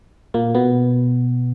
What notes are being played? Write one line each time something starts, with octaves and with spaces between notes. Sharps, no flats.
A#2 A#3
B2 B3